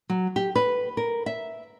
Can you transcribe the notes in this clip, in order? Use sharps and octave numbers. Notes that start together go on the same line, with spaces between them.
F#3
G4
B4
A#4
E5